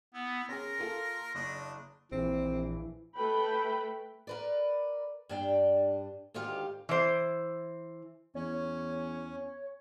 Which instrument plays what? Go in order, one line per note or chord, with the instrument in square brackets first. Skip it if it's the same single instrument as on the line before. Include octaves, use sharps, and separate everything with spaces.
[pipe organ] B3 [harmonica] E4
[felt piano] C#4 G#4 [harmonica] A#4 C6 [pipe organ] A#6
[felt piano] A#3 F4 A4
[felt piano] F#1 [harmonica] D4 D#5
[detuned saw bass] A#1 [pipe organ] E3 [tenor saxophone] C4
[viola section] A3 A4 B4 G5 B5
[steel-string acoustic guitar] A#4 B4 D5
G2 D4 G5
D2 G#2 D#3 F4 G4 F5
[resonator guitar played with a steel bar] E3 C5
[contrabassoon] E2 [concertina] C#4 [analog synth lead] C#5